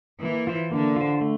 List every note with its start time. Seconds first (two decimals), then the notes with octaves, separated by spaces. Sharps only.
0.22 E3 A#3
0.47 F4 C5
0.71 D3 A#3
0.96 F4 C5
1.21 A3